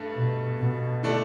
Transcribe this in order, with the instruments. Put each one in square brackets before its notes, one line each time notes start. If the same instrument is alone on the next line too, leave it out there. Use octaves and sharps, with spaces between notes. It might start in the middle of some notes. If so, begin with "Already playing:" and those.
Already playing: [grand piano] G2 A3
[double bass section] B2
B2
[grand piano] D3 A3 D4